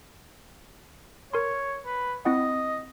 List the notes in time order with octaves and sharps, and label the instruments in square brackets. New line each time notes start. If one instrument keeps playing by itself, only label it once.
[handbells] A#4 C6 [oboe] C#5
[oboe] B4
[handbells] C4 E4 F#5 [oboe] D#5